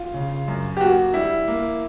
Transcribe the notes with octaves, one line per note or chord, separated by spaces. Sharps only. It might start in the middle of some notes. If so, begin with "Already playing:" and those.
Already playing: F4
C#3
F#2
G4
A#3 F#4
G3 E4
A#3